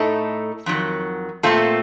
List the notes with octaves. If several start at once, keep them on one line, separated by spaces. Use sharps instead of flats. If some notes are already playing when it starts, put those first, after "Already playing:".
Already playing: A2 A3 D#4 A4
F2 D#3 F#3
A#2 A3 C4 F4 A4